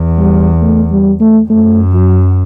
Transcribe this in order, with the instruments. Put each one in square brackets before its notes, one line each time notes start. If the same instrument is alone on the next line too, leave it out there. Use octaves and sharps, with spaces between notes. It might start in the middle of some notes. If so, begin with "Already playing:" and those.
Already playing: [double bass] E2
[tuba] G3
A3
G3
A3
[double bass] F#2 [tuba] A3
[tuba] F#3